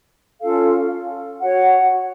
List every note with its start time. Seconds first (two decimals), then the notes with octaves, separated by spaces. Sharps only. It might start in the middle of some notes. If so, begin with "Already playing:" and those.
0.41 C#4 F4 A4 F5
1.40 F#4 C#5 F#5